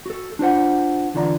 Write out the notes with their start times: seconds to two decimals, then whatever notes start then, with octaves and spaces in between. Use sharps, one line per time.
0.06 F#4 A4
0.39 D4 F4 C5 F#5
1.14 E2 D3 F4 D5 A#5